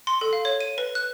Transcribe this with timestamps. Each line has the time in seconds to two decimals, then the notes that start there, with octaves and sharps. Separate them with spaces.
0.07 C6
0.21 A4
0.33 F5
0.45 C#5
0.60 D#7
0.78 B4
0.95 F#6